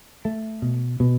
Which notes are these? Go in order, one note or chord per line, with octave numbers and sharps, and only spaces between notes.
A3
B2
B2